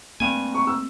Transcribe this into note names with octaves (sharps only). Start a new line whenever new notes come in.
G2 A3 A#3 C4 G#5
C#6
E6